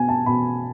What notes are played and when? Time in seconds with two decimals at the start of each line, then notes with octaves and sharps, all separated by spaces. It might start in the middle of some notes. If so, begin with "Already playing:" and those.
Already playing: B2 B3 G#5
0.09 A5
0.26 B2 B5